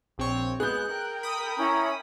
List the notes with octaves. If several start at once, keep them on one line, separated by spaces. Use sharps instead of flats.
A#1 C4 C#5
G#3 B3 G#4 F#6 G6
A#4 G5
B5 D#6
C#4 E4 A#5